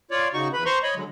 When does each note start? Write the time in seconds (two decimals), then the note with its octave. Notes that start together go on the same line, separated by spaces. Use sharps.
0.11 F4 C#5 D5
0.34 C#3 D#4 F#4 C#6
0.53 E2 B4 B5
0.66 C5 A#5 C6 C#6
0.83 C#5 D#5 B5
0.95 D3 F#3 G#3